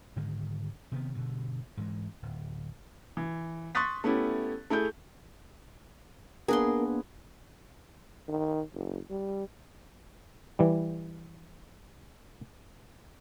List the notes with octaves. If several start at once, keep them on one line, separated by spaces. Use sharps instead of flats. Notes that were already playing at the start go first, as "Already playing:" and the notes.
G#2 D3 D#3 G#3
C3 D#3 G3 B3
G2 B2 D3
G#2 E3 G#3
D1
E3
C6 C#6 D#6 F#6 A6 B6
A3 B3 C#4 E4 G4
A3 E4 G#4 G6
A#3 B3 D4 G#4 A#4 B4 C6
D#3
F#1
G3
E3 G3